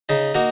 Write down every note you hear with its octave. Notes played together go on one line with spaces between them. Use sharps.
C#3 D#4
A#3 D#4 F#4